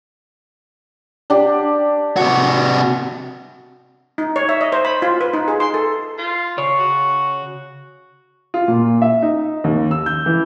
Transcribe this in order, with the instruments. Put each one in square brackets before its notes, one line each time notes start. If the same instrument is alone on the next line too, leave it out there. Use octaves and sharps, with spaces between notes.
[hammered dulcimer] D4 G4
[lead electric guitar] C3 F#4
[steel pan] D#4
C#5
E5
D#5
C5
B5
F4
B4
D#4
G#4
C6
A4
[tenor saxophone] F4
[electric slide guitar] C#3 C#5 [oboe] C#6
[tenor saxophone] F#4
[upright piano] F4
A#2
E5
D#4
D#2
E6
G6
E3